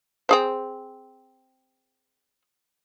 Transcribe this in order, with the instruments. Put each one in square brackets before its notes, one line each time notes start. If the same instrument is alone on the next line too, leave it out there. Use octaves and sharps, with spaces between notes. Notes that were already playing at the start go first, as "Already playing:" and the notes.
[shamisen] C4 G#4 C5